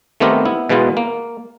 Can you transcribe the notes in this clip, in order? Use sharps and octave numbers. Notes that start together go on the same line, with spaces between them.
D#3 A3 B3 C4 G4 A#4
B3 E4
B2 E3 G#3 B3 F4
A#3